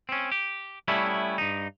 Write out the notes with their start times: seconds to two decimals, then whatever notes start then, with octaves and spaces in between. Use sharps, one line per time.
0.09 C4 C#4
0.32 G4
0.88 G3 A3 B3 C#4 E4
1.38 G2 D#4